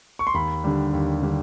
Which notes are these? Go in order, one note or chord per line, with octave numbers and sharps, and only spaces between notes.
C#6
C6
D#2 B5
D3 G3
D#2
D3 G3